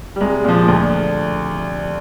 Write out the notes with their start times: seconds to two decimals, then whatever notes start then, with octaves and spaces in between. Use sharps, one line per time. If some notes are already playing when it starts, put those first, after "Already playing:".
0.16 G3
0.21 C2 G#3
0.45 A#2 F3
0.68 D2